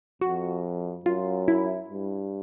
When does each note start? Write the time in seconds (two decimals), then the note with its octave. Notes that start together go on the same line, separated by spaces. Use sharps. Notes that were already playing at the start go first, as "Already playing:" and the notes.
0.21 F2 F#4
1.05 F#2 F4
1.48 E4
1.89 G2